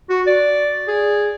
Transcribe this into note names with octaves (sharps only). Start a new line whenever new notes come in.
F#4
D5
G#4